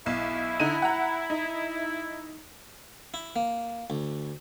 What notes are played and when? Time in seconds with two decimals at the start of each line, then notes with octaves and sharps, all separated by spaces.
0.06 B1 E4
0.60 D3 D#4 D#7
0.82 F#5 A#5
1.30 D#4
3.14 E4
3.36 A#3
3.90 D2